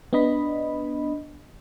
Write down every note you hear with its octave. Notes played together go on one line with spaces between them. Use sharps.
B3 D4 D#5 B5